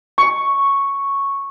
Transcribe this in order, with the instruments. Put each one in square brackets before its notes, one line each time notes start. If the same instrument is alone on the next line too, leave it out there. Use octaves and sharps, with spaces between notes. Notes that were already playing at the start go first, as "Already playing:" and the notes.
[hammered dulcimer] C#6